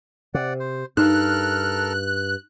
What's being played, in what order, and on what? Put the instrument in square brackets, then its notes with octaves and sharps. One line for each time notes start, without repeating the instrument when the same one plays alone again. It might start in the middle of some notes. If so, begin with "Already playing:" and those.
[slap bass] C3 [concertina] D5 F#5
[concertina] C5
[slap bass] G2 [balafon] D#4 [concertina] A4 A#4 F6 [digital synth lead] F#6